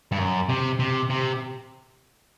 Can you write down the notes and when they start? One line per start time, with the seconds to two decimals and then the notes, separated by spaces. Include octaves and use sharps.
0.12 G2
0.18 F#2
0.49 C3
0.79 C3
1.10 C3